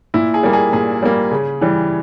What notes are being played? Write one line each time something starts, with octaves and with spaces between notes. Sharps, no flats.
A#2 E4
G#4
G3 A#3
G#4
A#2 G#4
G3 A#3
C#3
E3 G3